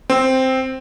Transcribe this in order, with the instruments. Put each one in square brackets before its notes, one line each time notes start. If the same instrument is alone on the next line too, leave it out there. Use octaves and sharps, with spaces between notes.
[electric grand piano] C4